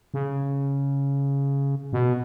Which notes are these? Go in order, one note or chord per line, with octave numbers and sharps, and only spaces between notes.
C#3
B2